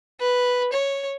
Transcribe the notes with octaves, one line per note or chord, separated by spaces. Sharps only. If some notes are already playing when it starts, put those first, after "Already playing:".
B4
C#5